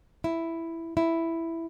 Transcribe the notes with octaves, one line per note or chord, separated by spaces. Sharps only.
E4
E4